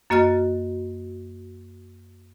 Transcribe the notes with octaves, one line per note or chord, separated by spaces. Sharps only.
F#2 A#3 F#4 D#5 F6 A6